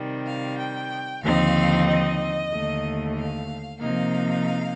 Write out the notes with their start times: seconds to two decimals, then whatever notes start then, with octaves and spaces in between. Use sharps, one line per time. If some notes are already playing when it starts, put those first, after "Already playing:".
Already playing: C3 D#3 G3
0.25 F5
0.58 G5
1.22 D#2 D3 F3 C4 D#4 F5
1.87 D#5
2.51 D#2 D3 A3
3.17 F5
3.80 C3 F3 A#3 D#4 F5